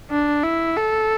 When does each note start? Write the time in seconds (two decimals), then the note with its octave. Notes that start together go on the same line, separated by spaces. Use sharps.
0.11 D4
0.43 E4
0.77 A4